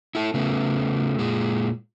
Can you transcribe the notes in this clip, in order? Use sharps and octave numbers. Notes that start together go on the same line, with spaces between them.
E4 A4
C#3 A3 B3
A#2 G#3